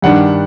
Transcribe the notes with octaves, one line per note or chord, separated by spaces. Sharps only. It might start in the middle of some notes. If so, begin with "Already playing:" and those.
G2 D#3 G3 D4 F#5